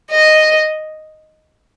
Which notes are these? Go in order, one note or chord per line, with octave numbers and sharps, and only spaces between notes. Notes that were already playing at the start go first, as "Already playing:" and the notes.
D#5